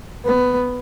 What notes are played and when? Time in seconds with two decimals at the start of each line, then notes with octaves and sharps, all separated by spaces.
0.25 B3